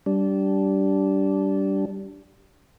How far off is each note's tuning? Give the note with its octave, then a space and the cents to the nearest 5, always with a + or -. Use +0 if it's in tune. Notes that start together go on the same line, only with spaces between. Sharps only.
G3 -15 D4 -15